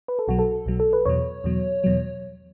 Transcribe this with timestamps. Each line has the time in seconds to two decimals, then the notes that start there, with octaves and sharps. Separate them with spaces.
0.08 B4
0.19 A4
0.28 B1 B2 F#3 F#4
0.39 A4
0.66 B1 B2 F#3
0.80 A4
0.93 B4
1.06 E2 B2 F#3 C#5
1.44 E2 B2 F#3
1.84 E2 B2 F#3